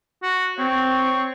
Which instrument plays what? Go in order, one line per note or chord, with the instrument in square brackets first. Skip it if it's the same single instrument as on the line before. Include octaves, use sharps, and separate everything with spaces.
[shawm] F#4
[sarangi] C4 [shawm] C#5